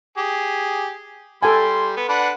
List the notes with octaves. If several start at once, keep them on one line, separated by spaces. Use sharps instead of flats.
G4 G#4
G3 A4 G5 G#5 C6
B3
D4 B4 F#5